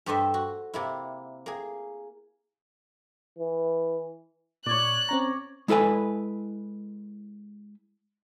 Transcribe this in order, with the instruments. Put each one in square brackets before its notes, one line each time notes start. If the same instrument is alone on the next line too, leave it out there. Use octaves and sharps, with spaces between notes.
[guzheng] G2 G4 A4 C5 D#5 E5
F#4
C3 A#3 E4
A#3 G#4
[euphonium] E3
[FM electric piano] A#2 G#6 [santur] C#5 D5 [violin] F#6
[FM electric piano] C4 C#4 A#5
[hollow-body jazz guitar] G#3 E4 A4 B4 G#5